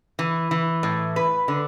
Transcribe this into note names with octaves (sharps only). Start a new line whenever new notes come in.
E3
E3
A2
B4
D3